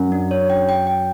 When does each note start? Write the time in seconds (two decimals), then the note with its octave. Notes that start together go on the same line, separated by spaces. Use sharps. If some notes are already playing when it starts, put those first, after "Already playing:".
Already playing: F#2
0.12 D4
0.31 C#5
0.50 G5
0.69 G5
0.87 G5